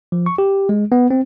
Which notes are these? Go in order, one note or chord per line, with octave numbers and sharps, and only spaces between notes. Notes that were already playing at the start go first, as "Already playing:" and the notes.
F3
C#6
G4
G#3
B3
C4